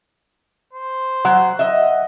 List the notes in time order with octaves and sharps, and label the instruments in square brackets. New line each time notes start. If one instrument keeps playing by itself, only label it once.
[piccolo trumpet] C5
[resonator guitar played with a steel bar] F#3 [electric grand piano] F#5
[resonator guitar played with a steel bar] D#5 E5